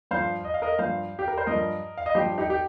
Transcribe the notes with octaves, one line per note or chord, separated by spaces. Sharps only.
G2 F3 C5 F5
D#5
F5
A#4 D#5
G2 F3 C5 F5
G4
A#4
C5
G2 F3 A#4 D#5
F5
D#5
G2 F3 G4 C5
D#4 G4
G4